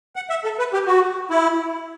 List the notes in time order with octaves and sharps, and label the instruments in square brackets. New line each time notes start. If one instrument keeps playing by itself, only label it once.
[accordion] F#5
E5
A4
B4
G4
F#4
E4